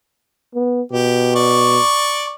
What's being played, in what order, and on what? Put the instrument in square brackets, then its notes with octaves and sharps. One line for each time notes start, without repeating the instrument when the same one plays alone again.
[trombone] B3
[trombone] B2 [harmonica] G4
[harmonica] D5 C#6